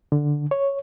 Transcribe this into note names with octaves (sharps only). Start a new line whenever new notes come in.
D3
C#5